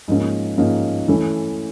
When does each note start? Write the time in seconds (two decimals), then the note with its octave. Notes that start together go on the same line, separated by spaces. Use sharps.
0.08 G#2 F3 A#3 C#4
0.58 G#2 F3 A#3 C#4
1.08 E3 A3 C#4